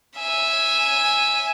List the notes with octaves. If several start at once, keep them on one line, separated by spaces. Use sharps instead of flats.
E5 G#5